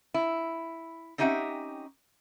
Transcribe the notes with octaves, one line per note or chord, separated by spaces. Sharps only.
E4
C4 C#4 D#4 G4 E5 F#5